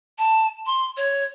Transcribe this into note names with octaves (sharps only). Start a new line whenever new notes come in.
A5
C6
C#5